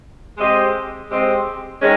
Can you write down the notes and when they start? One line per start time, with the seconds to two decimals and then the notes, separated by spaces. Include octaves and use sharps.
0.37 G#3 C4 G4 C5 D#5
1.08 G#3 C4 G4 C5 D#5
1.80 D#3 G#3 C#4